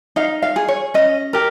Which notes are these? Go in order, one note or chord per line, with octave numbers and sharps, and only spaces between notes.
D#4 F5
F5
G#4
C#5
C#4 D#5
G4 A#4